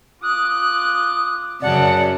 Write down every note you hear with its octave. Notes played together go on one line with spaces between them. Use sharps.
F4 D6 D#6 F#6
F#2 C#3 D5 F#5 A5